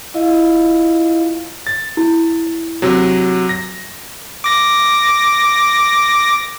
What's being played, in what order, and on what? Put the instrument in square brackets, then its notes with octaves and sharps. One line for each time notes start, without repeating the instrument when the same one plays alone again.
[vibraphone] E4 F4 D#5 F5
[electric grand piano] A6
[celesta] E4
[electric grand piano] C3 F#3
A#6
[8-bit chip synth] D6 A#6